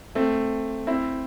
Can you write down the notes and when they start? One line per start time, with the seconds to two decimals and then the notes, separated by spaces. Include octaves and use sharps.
0.15 A3 C4
0.87 C4 E4